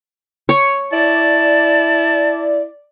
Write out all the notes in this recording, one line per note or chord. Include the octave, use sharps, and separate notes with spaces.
C#5
E4 D5 A5